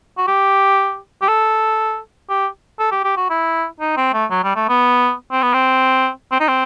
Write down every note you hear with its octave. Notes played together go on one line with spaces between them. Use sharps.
F#4
G4
G4
A4
G4
A4
G4
G4
F#4
E4
D#4
C4
A3
F#3
G3
A3
B3
C4
B3
C4
C4
D#4
C4